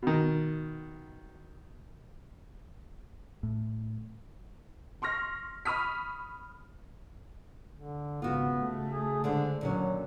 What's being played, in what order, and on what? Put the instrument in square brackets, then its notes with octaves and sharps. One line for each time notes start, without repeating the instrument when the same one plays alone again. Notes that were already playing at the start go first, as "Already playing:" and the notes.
[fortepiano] B2 D#3
[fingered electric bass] A2
[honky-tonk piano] C6 C#6 F6 A#6
B5 C#6 D#6 F6 B6
[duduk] D3
[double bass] G#1 C#3 [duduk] B3 [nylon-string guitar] F4 F#4
[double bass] C#3 A3
[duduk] G#4
[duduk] D3 [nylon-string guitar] G#3 D4 C5
[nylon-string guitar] A#2 D#3 C#4 [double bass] D3 [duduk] F#3